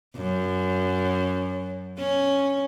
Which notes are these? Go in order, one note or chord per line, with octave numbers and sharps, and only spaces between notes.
F#2
C#4